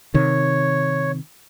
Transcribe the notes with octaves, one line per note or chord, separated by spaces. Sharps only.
C3 D#3 C#5